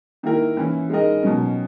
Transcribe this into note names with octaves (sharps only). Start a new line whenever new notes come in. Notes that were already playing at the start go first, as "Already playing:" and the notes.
D#3 A#3 E4 A#4
E3 A#3 C#4 E4
G#3 D#4 A#4 D#5
B2 F#3 C#4